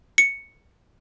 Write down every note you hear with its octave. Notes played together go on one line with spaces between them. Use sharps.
C#7